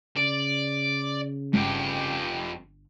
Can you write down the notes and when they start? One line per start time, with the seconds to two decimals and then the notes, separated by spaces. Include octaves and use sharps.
0.17 C#3 D5
1.53 G1 F2 G4